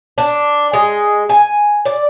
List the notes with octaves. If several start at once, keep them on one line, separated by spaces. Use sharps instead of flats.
D4
G#3
G#5
D5